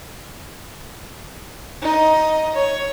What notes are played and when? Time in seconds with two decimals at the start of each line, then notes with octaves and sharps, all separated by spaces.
1.81 D#4 D#5
2.54 C#5